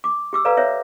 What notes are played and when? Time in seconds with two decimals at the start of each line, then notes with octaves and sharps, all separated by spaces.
0.04 D6
0.33 G4 D6 E6
0.45 A4 B4 C5 D5 F5 A#5
0.57 C5 C#5 E5